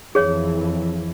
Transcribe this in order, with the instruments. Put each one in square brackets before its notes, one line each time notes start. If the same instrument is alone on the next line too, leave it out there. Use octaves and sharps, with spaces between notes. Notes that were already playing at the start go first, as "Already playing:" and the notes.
[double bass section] F2 E3 [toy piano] G#4 C#5